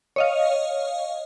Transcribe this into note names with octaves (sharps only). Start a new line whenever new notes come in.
C#5 D#5 F5